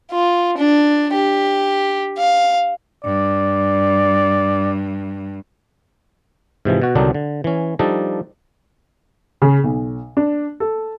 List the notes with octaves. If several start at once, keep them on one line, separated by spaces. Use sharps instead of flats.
F4
D4
G4
F5
G2 D5
G#2 C3 E3 F3
B2 F#4
C2 D3 D#3 F#3 D4 D#4
D3
E3 C#4
F3 G3 D4 D#4 A4 D#5
C#3
B1
D4
A4